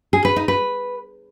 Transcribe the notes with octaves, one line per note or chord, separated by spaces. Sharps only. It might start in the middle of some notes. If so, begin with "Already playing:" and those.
G#4
B4
D#4
B4